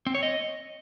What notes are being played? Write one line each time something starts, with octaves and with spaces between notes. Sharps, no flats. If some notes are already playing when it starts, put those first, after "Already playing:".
C4
C#5
D#5